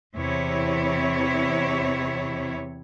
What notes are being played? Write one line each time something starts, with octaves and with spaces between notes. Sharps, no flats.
E2 C3 E4 C#5